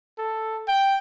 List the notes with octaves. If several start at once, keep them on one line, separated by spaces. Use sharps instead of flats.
A4
G5